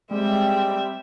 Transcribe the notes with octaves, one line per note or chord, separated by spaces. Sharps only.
G3 G#3 C4 E5 G5